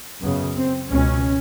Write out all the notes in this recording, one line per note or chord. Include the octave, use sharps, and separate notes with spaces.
F#2 C#3 B3
C4
C#2 B2 C#4